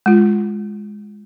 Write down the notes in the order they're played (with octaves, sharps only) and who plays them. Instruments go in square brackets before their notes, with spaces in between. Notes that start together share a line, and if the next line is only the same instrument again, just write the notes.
[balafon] G#3 F4